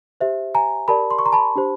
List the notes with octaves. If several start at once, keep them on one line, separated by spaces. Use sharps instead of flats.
G4 C5 E5
G#5 A#5
G4 A#4 D5 A5 B5
C6
C#6
A#5 C6
A5 B5
D4 G4 C5